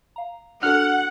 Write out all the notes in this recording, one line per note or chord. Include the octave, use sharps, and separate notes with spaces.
F5 A#5
D4 F#4 A4 F#5 F6 F#6